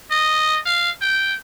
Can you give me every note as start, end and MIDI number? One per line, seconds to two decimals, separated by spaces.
0.11 0.59 75
0.66 0.90 77
1.01 1.34 79